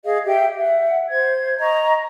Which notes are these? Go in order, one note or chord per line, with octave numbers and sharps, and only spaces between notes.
G#4 D#5 F5
G4 E5 G5
E5 F#5
C5 G#6
D#5 A#5 C#6